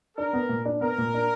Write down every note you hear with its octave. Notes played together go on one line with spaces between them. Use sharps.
D4 A#4
B3
A#2
D4
B3 A#4
A#2
D4